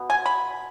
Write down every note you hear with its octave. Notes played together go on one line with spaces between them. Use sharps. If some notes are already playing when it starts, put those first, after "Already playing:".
Already playing: B2 B3
G#5
B5